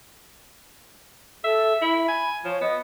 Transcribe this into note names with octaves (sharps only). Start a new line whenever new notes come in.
A4 E5
E4 B5
G#5
F3 C#5
B3 D#5